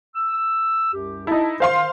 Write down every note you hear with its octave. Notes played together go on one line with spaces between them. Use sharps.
E6
C2 F#2 G4
D#4 E4 A4 A5
D#3 C5 F5 C6